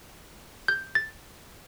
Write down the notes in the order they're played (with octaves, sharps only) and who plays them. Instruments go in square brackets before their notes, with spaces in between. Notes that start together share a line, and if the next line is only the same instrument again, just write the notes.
[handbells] G6
A6